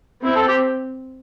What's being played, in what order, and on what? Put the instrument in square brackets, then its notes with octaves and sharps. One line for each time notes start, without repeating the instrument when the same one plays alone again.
[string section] C4 [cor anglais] E4
[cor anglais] A4
G4